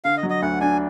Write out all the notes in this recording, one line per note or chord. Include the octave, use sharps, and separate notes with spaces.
D3 F5
D#5
F#3
D#5
D2 F#5
D4 G#5